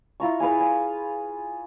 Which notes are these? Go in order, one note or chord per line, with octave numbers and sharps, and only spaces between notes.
E4 F4 A#5 C#6
G#4 B4 F5 G#5
G#5